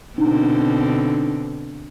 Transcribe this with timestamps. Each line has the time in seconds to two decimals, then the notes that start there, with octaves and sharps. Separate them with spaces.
0.18 B2 D3 C4 D4 D#4